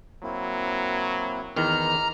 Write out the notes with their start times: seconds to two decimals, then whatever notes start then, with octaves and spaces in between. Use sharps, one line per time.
0.23 F#3 A#3 C4 E4
1.56 E2 D#3 A#5 F6